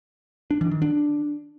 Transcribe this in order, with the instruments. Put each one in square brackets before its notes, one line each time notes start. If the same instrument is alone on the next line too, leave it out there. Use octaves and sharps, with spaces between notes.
[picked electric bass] D4
E3
D#3
D4